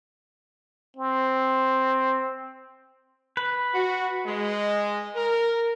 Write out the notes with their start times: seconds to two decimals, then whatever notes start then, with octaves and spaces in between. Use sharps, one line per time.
0.97 C4
3.37 B4
3.74 F#4
4.26 G#3
5.15 A#4